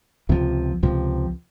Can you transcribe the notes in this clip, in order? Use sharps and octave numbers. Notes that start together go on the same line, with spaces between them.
C#2 C3 F3
C#2 C3 F3